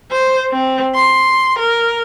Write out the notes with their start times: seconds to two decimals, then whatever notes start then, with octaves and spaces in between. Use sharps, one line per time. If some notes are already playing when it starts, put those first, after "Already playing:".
0.12 C5
0.52 C4
0.95 C6
1.59 A#4